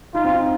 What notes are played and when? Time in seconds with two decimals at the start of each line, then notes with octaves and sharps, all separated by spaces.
0.15 D#4 F4
0.25 C4
0.34 D#4